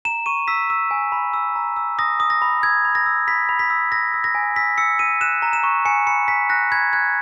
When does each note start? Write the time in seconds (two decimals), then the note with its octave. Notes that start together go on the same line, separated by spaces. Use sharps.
0.05 A#5 E7
0.26 C#6 D#7
0.48 E6 B6
0.70 E6
0.91 G#5
1.12 B5
1.33 E6
1.56 A#5
1.76 E6
1.99 D#6 A#6
2.20 D#6
2.30 A#6
2.42 B5
2.63 E6 G#6
2.85 B5
2.95 A#6
3.06 E6
3.27 B5 B6
3.49 B5
3.59 B6
3.70 E6
3.92 E6 A#6
4.14 E6
4.24 A#6
4.35 G#5
4.56 E6 B6
4.78 E6 C#7
4.99 E6 D#7
5.21 F#6 E7
5.42 A#5
5.53 E7
5.63 C#6
5.85 G#5 C#7
6.07 B5 C#7
6.28 G#5 B6
6.49 F#6 A#6
6.71 B5 G#6
6.93 F#6 G#6